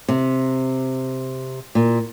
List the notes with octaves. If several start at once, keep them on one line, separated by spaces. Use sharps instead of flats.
C3
A#2